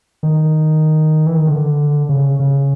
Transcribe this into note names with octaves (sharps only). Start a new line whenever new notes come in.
D#3
E3
D#3
D3
C#3
C#3